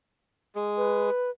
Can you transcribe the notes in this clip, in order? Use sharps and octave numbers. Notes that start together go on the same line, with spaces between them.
G#3
B4